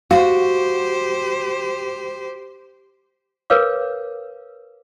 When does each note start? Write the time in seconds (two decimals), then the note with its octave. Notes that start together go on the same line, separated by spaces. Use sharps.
0.11 F#4 G4 C5 F5
3.50 A#4 B4 C#5 F5 D6